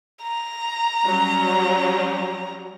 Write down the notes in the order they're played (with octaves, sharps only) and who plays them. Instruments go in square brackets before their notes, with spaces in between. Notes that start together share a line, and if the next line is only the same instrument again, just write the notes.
[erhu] A#5
[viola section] F#3 G3 C#4